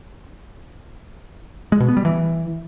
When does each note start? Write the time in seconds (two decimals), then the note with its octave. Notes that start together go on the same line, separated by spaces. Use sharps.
1.72 G#3
1.80 B2
1.88 B3
1.97 G3
2.05 E3